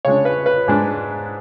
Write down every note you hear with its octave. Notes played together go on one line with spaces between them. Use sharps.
C#3 G#3 D4 C#5
B4
B4
G#2 G#3 D4